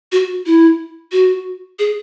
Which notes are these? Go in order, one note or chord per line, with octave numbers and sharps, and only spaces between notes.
F#4
E4
F#4
G#4